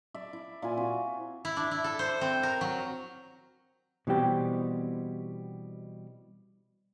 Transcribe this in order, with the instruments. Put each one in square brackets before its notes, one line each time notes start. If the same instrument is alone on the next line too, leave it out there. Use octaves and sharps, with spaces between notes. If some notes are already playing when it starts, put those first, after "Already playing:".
[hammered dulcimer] D5 E5
E4
A#2 E4 F4 G#5
C4 F#4
[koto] E4
D4
E4
A4
C5
C4
A#4
F#3
[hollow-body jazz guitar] B2 E3 G3 C4 G4